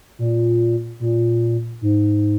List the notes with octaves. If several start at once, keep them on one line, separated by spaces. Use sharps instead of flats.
A#2
A#2
G#2